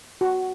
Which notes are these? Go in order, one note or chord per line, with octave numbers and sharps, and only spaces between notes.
F#4